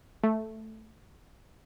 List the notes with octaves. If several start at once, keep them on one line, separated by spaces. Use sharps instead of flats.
A3